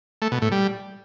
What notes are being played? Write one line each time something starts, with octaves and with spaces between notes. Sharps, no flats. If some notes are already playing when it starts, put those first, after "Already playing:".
A3
B2
A2
G3